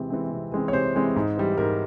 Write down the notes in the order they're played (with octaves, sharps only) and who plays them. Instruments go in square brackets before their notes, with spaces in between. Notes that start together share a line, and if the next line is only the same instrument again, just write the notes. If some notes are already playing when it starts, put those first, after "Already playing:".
Already playing: [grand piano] C3 E3 G#3 C4
E3 G#3 C4
C3
E3 G#3 C4
C#5
C3 C5
E3 G#3 C4
G#2
E3 G3
G#2 A#4